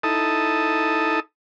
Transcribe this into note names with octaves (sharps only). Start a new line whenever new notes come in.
D#4 E4 A4 A5 D#6